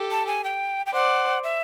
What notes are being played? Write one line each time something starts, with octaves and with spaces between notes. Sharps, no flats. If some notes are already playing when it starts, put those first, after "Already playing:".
Already playing: G4 A4
A5
G#5
G5
G5
C5 D5 F#5
E5